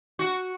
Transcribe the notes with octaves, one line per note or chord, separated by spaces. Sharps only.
F#4